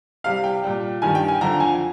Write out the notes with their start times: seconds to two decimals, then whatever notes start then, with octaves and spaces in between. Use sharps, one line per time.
0.24 C3 G3 F5
0.44 G5
0.64 A#2 G3
1.02 G2 D#3 G3 G#5
1.15 G5
1.28 G#5
1.41 F2 D3 F3 A#5
1.60 G#5